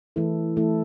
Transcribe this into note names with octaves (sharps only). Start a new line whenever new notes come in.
E3 A3 E4 A4
E3 A3 E4 A4